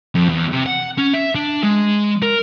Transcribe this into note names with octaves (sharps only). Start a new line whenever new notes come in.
F2
E2
C3
F#5
C#4
E5
D4
G#3
A#4